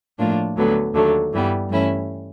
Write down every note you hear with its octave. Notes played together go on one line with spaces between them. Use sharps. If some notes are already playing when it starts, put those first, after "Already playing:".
A2 F3 A#3 D4 F4
D2 D3 F#3 B3
D#2 D3 F#3 A3
G2 E3 G3 B3
G2 E3 A3 C#4 E4